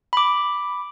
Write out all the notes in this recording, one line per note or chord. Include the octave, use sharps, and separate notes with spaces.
B5 D6